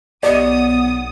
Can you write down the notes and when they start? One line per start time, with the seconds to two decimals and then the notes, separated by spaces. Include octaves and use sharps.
0.23 B1 B3 G4 D5 D#5 D#6